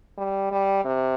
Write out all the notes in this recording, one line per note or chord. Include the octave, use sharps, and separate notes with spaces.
G3
G3
C3